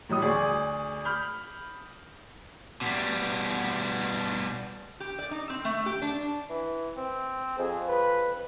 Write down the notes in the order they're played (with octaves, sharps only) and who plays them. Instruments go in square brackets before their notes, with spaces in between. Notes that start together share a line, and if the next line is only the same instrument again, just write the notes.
[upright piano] A2 F#3 G3 D#6
D2 G#4 D5 C#6
B5 F6 G6
[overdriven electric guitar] B2 G3
[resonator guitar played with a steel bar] G4
D5
D#4
C4
A3
G4
D4
[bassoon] E3
C4
[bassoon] F2 [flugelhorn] G#4
[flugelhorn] B4